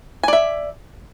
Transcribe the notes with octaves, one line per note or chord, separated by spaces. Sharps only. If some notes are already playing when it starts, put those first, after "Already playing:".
D5 E5 G#5